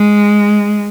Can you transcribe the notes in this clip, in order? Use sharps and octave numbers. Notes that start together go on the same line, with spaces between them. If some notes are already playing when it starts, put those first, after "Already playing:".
Already playing: G#3